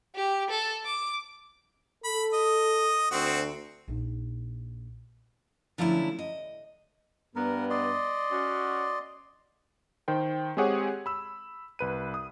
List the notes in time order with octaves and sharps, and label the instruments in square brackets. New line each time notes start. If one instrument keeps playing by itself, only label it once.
[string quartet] G4
A4
D6
[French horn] A4 [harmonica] B5
[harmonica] D#5
[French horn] D2 [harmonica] C4 F#4
[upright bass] A#1 D#4
[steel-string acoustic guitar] D3 F3 F#3 A3 C#4 E4
D#5
[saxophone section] G2 B3 [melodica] A#4
[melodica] D5 D#5 C6
[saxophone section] C#4 F#4
[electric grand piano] D#3 C5 G5
G#3 C4 G4 G#4 C#5 F#5
B5 E6
C2 B4 D#7
D#6